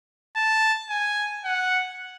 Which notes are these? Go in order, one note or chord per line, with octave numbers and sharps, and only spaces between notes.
A5
G#5
F#5